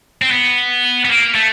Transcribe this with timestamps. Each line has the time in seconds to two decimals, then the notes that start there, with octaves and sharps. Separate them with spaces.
0.22 C4
0.31 B3
1.05 B3
1.09 A#3
1.35 A3